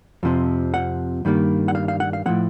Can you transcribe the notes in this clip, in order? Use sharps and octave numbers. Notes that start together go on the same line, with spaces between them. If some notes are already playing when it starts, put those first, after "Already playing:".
F2 C3 F3
F#5
G2 D#3 G3 A#3
F#5
F5
F5
F#5
F5
A2 F3 A#3 F#5